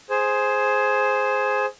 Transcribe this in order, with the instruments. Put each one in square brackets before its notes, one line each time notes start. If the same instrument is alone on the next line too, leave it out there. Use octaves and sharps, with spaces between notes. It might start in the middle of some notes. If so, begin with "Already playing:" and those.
[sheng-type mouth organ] G#4 C5